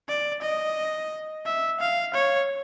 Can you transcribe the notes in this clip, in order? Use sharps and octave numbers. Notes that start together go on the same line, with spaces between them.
D5
D#5
E5
F5
C#5